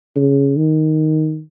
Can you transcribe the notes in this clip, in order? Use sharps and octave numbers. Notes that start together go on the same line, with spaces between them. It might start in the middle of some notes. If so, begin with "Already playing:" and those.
C#3
D#3